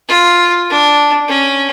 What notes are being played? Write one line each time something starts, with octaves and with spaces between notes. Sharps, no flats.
F4
D4
C#4